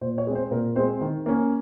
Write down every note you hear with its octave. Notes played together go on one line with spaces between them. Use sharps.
A#2 C5
C#5
G#3 C4
C5
A#2 A#4
G#3 C4 C5
D#3
A#3 C#4